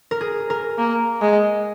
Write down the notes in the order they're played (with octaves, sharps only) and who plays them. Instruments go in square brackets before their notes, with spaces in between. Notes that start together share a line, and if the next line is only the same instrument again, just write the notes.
[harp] A#4
G#4
A#4
[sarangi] A#3
G#3